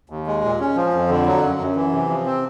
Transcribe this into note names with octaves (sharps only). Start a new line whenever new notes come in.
D#2
G#3
A#2
C#4
F3
F2
D3
F#3
F#2
F#2
E3
C3
F3
C4